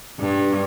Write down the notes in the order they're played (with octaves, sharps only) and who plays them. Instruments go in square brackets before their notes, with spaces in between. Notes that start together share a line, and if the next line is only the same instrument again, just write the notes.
[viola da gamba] G2